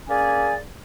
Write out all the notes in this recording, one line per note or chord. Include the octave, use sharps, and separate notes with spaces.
A#3 C#4 G#4 D5 G#5